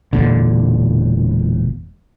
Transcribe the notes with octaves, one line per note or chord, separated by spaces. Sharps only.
E1 A#2 D3